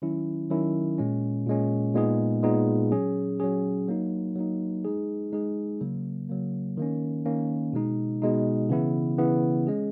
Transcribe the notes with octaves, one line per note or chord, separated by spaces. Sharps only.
D#3 F#3 C#4 E4
D#3 F#3 C#4 E4
A#2 G#3 C#4
A#2 G#3 C#4
A#2 G#3 B3 D#4 G#4
A#2 G#3 B3 D#4 G#4
F#3 C#4 G#4
F#3 C#4 G#4
F#3 A#3 D#4
F#3 A#3 D#4
G#3 D#4 G#4
G#3 D#4 G#4
C#3 F#3 A#3
C#3 F#3 A#3
D#3 A#3 C#4
D#3 A#3 C#4
B2 G#3 D#4
B2 G#3 D#4
C#3 E3 B3 E4
C#3 E3 B3 E4
G#3 C#4 G#4